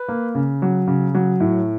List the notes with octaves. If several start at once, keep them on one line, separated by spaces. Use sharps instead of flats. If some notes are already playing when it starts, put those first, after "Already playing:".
Already playing: B4
A#3
C#3
F#3
C#3
F#3
A2